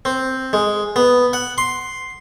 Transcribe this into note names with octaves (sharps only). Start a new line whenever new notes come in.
C4
G#3
B3
F#5
C6